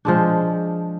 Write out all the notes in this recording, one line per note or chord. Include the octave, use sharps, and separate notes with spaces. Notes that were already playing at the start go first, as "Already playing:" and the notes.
F3 G#3 D4